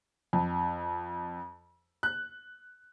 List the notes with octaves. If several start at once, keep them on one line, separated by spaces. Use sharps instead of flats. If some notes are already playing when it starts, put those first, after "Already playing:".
F2
F#6